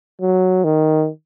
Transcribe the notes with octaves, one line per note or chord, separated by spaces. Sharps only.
F#3
D#3